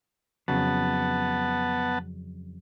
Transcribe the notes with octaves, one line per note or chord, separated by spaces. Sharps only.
F2 C#3 F#3 B3 F#5 A5